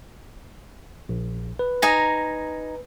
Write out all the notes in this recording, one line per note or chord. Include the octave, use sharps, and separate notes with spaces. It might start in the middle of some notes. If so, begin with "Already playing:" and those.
A#1
B4
D#4 G#5 A#5